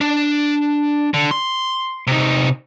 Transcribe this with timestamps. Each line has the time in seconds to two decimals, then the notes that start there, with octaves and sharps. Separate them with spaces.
0.01 D4
1.14 D3
1.31 C6
2.07 C3 D#4